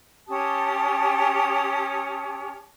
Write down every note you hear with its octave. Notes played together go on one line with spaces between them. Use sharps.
C#4 G4 A5 D#6